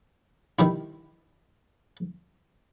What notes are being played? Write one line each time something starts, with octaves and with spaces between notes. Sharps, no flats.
D#3 G3 E4